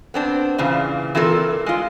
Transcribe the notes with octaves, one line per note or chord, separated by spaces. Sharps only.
B3 C4 D4
A#2 C#3 E3
E3 C4 F4 A4 A#4 D5
G#3 F4